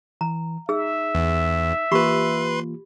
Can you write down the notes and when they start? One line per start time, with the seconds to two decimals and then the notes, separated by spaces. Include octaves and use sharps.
0.21 E3 A#5
0.69 D#4 G#4 E5 E6
1.15 E2
1.92 E3 A#3 F4 G4 B4 B5 C6